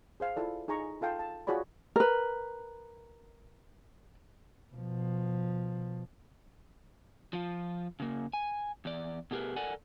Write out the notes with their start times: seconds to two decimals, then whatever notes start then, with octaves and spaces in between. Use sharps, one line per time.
0.20 G#4 C5 F5
0.36 E4 F4 A4 D5
0.68 D#4 G#4 G#5 A#5 C#6
1.01 F4 A4 F5 G5 A5 C6
1.19 A5
1.47 F4 F#4 G#4 C#5 D5 B5
1.96 A#4 B4
4.73 B2 F3
7.33 F3 F4
8.00 C#3 A#3
8.33 G#5
8.85 E2 D5
9.31 B2 A3 G4 G#4 A#4 B4
9.56 A4 A#4 D5 F#5 G#5